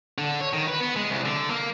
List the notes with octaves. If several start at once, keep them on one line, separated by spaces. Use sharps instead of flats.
D3
C#5
D#3
B4
B3
G#3
C2
D3
A#3